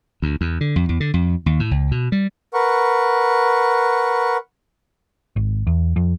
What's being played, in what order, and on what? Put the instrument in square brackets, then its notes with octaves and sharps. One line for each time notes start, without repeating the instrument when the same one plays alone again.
[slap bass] D2
E2
D3
F2
E2
D3
F2
D#2
A2
C#2
B2
G3
[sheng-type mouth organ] A#4 B4 F#5 C#6
[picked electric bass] G#1
E2
F2